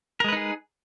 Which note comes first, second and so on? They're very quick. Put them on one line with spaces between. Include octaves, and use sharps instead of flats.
A#4 G#3 B4 D#4 G#4